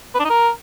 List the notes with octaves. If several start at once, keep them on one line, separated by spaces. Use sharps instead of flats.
B4
D4
D#4
A#4